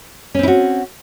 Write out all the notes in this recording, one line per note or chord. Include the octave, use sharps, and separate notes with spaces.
C4 C#4 E4 F#4